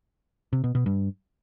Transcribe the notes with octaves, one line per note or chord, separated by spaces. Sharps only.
C3
B2
B2
G2